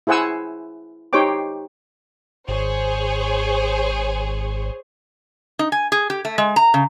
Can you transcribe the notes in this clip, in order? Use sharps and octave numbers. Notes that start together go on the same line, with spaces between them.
E4 G#4 C5 F#5 G#5 E6
D#4 G4 C5 C#5 G5 D6
G#1 G#4 C5 C#5
D#4
G#5
G#4
G4
A3
G#3
A#5
C#3